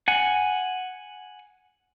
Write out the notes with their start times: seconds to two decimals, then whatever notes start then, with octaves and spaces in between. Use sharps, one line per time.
0.08 F#5 G#5